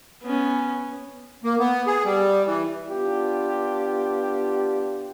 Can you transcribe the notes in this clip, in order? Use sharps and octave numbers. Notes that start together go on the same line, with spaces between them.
B3 C#4
A#3
B3
G#4
G3
E3
B3 D4 F4 G4